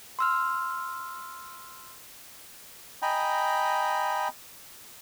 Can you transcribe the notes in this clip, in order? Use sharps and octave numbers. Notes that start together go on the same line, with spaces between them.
C6 E6 F6
D#5 G5 G#5 A#5 B5